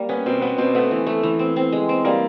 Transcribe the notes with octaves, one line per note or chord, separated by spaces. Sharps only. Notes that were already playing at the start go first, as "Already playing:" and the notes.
Already playing: G3 A#3
B3 C#4
B2 C4
B3 C#4
B2 C4
A3 B3
E3
A3
E3
C4
C4
G#3
C4
G3 A#3